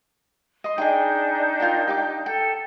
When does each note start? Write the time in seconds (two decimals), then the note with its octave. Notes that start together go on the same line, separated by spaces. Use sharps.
0.64 D#5 C6
0.78 D4 D#4 G#4 D#5 G5 G6
1.60 F4 A#4 G5
1.88 G4 G5 D6
2.26 A4 G5